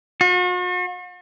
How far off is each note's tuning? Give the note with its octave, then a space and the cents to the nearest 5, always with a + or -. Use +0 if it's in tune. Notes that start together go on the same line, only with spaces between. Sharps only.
F#4 -45